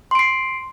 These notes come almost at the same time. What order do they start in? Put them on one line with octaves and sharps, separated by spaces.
C6 D7 C7